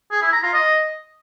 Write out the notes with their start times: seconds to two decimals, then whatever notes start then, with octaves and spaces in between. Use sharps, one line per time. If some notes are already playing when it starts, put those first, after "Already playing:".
0.11 G#4
0.22 E4
0.32 A#5
0.43 F4
0.53 D#5